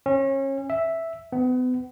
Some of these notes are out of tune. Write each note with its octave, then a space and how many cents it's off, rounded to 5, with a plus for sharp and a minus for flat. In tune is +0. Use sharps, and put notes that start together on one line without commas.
C#4 -30
E5 +0
B3 +35